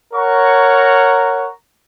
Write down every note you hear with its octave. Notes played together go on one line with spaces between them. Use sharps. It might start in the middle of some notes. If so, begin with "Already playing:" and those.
A#4 C#5 F#5 A#5 C#6